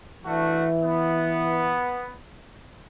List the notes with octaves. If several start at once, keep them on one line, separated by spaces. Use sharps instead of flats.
E3 A3 D4 F#4
B3